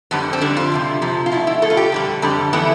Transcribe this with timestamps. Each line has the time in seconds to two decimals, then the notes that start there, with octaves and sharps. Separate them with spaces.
0.11 F2 D3 G3 B3
0.33 C4
0.41 F2 D3 G3 D4
0.57 F4
0.72 F2 C3 F3
1.02 F2 C3 F3
1.26 F4
1.32 B2 A3 E4
1.47 E4
1.62 B2 A3 A4
1.70 F4
1.77 G4
1.92 F2 D3 G3
2.22 F2 D3 G3
2.53 E3 A3 B3